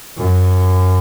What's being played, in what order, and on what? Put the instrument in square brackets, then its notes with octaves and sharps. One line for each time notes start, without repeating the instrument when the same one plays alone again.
[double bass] F#2